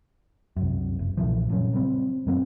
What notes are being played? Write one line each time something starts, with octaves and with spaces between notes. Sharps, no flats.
C2 F#2
F#1
B1 A#2 E3 F3
F#1 A#2 F#3 C#4
C#3 F#3 G3 C4
F#2 F#3 A#3 C4